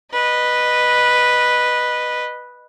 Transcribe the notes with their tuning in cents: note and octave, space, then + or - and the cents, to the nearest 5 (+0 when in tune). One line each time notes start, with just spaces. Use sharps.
B4 -5 D#5 -20